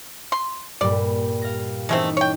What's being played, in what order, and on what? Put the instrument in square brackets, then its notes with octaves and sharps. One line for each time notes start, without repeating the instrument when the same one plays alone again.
[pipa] C6
[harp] G2 A#2 G3 [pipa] D5
[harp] F5 A#6
[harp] E3 C#4 D#4 [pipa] G#3 A3 C4
[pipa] C#5 G5